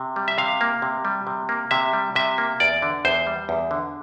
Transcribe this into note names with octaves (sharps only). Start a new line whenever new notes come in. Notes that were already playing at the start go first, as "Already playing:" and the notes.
Already playing: C3
G3
E5
C3 F5
A#3
C3
G3
C3
A#3
C3 E5
G3
C3 E5
A#3
E2 D5
D3
E2 C5
G3
E2
D3